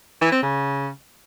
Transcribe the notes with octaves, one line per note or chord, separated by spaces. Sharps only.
E3
C4
C#3